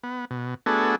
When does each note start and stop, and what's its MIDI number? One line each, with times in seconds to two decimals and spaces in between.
0.03 0.25 59
0.31 0.55 47
0.66 0.96 57
0.66 0.96 59
0.66 0.96 62
0.66 0.96 66
0.66 0.96 68
0.66 0.96 69